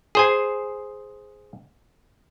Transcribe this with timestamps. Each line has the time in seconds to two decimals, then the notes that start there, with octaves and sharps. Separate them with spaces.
0.15 G#4 C5 G#5